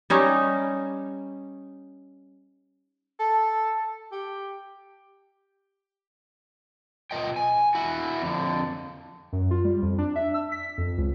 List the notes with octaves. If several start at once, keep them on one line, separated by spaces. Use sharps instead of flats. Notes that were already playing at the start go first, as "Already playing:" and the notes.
G3 C#4 D#4
A4
G4
B2 F4 D#5 G5
G#5
E4 F#4
F2 D3
F#2
F4
G3
F2
D4
E5
E6
B6
F2
C#2